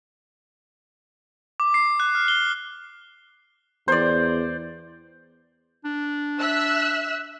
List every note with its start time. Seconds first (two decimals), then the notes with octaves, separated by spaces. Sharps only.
1.60 D6
1.74 C7
2.00 F#6
2.15 F6
2.28 G7
3.88 E2 C5 D5
5.85 D4
6.39 E5 E6 F#6